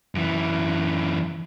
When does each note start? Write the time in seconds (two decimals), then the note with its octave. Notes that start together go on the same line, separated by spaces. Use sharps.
0.15 F#2 E3